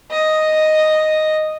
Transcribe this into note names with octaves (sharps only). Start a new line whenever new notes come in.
D#5